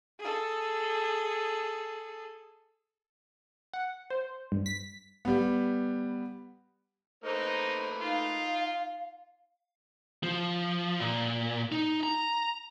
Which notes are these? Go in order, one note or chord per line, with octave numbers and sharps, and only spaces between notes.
G#4 A4
F#5
C5
G2
B6
G3 B3
A3 A#3 D#4 B4 C5
D#4 F4 F5
F3
A#2
D#4
A#5